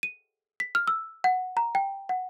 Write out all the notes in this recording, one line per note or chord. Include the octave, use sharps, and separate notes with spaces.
D#7
B6
F6
E6
F#5
A#5
G5
F#5